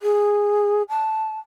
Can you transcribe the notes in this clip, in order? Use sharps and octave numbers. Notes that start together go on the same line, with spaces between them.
G#4
A5